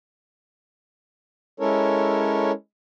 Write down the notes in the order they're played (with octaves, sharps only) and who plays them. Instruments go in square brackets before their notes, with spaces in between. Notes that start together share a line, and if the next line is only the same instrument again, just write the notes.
[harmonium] G#3 C#4 E4 A4 A#4 C#5